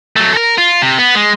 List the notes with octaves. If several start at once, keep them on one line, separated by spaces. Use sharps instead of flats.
F#3 A3
A4 A#4
F4
C3
B3
G#3